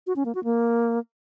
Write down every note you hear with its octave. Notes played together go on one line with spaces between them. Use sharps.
F#4
C#4
A#3
F#4
A#3